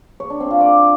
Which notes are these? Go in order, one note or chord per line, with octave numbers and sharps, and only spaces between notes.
C#5
D4
C4
F4
D5